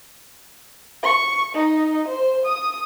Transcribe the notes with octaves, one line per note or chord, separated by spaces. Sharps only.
C#6
D#4
C5
D#6